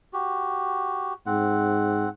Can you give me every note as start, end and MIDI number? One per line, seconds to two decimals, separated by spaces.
0.13 1.13 66
0.13 1.13 67
1.26 2.06 44
1.26 2.09 60
1.26 2.09 78